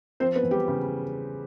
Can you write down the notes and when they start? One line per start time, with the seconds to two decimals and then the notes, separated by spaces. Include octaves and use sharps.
0.20 F3 C4 C5
0.35 B3 B4
0.43 E2
0.51 G3 G4
0.68 C#3